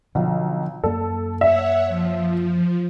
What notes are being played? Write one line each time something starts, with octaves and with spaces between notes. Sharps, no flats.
B1 D3 F3
F#2 A#3 A4
C#5 E5 F#5
F3